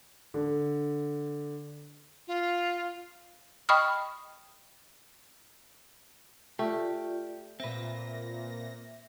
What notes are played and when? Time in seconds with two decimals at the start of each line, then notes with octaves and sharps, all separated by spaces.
0.34 D3
2.27 F4
3.69 D#5 G5 B5 C#6 D#6 F6
6.59 A3 F4 G4 D5
7.60 A#2 C4 B4 E5 A#6